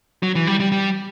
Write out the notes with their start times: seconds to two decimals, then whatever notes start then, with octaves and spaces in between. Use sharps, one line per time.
0.23 F#3
0.35 E3
0.47 G3
0.60 G3
0.72 G3